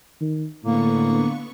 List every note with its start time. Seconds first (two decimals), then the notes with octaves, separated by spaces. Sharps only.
0.21 D#3
0.64 A2 D3 A#3 B3 C#6